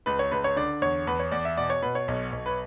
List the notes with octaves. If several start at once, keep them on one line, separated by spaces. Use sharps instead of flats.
C#2 B4
C#5
C#2 B4
C#5
D3 D5
E2 C#5
E2 B4
C#5
E2 D5
E5
B2 D5
C#5
B2 B4
C#5
B1
B1
B4